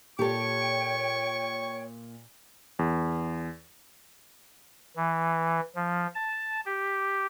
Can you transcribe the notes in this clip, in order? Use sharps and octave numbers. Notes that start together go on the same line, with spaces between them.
A#2 G4 A4 C#5 G5 C#6
E2
E3
F3
A5
G4